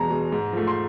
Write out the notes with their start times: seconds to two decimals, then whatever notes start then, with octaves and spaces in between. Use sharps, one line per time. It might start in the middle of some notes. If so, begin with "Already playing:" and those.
Already playing: E2 B2 G#3 A5 A#5
0.10 B2 G#3
0.32 G#2
0.53 F3 A3
0.67 C6